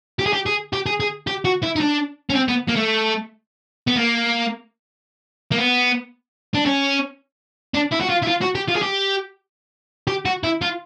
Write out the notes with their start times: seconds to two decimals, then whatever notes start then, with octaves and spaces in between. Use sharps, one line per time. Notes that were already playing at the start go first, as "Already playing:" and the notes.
0.19 G4
0.26 G#4
0.33 G4
0.46 G#4
0.73 G4
0.86 G#4
1.00 G#4
1.27 G4
1.45 F#4
1.63 E4
1.76 D#4
1.81 D4
2.30 C#4
2.35 C4
2.48 B3
2.68 A#3
2.76 A3
3.88 B3
3.97 A#3
5.52 A#3
5.58 B3
6.55 D4
6.66 C#4
7.75 D4
7.92 E4
8.01 F#4
8.10 F4
8.23 E4
8.28 F4
8.42 F#4
8.55 G4
8.68 F4
8.75 G#4
8.82 G4
10.07 G4
10.25 F#4
10.44 E4
10.62 F4